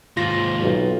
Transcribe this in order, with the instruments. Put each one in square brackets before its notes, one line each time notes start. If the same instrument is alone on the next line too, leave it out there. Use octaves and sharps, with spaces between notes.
[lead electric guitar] D#2 G#2 [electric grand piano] F4 A#6
[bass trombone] B1